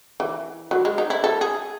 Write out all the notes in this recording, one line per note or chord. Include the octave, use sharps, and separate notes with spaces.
E3
F#3
G#3
D#4
E4
A4
G#4